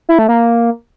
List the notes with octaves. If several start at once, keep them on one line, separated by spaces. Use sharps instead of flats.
E4
A3
A#3